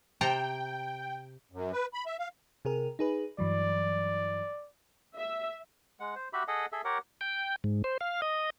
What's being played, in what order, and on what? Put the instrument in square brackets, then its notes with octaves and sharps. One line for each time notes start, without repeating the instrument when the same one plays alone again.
[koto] C3 A5 A#5 [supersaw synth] G5
[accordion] F#2
B4
B5
E5
F5
[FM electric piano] C3 G#4 A#4
D#4 G#4 B4
[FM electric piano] G2 E3 F#3 [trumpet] D5
[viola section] E5
[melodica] G#3 F#5
C5
F#4 G4 E5 B5
G#4 A4 D#5 F#5
G#4 A4 E5
G4 A#4 C#5 F#5
[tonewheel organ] G5
G#2
C5
F5
D#5